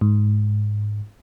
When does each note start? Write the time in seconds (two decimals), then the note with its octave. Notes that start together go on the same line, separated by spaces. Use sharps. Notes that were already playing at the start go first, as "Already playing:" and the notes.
0.01 G#2